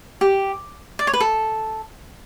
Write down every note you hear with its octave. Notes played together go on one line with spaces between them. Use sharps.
G4
D5
C#5
B4
A4